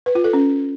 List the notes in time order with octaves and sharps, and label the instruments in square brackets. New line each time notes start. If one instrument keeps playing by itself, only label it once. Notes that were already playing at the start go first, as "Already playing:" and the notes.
[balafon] B4
F4
A4
C#4